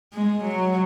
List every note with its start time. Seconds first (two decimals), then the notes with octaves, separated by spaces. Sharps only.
0.14 G#3
0.44 F#3